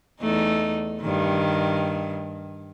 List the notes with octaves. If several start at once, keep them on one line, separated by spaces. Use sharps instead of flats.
E2 A3 D#4
G2 D#3